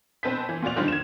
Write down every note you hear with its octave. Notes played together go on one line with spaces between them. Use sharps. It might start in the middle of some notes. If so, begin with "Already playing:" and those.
B2 C4 B4 A5 G6 B6
E3
A#2 F4 F#4 D5 F7
D3 D#3 F3 G3 D4 F4
G#6 E7